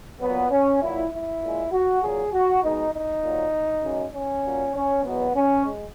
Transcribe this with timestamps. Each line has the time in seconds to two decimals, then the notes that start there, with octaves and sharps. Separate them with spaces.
0.21 A#2 F#3 B3
0.51 C#4
0.81 A#2 F#3 E4
1.11 E4
1.42 A#2 G#3
1.72 F#4
2.02 A#2 F#3 G#4
2.33 F#4
2.62 B2 G#3 D#4
2.93 D#4
3.23 A#2 F#3
3.83 F#2 C#3 G#3
4.13 C#4
4.45 A#2 F#3
4.75 C#4
5.04 E2 B2 F#3 B3
5.35 C#4
5.64 G#3